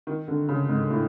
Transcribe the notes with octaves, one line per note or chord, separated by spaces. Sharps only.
D#3
D3
C#3
G#2
A2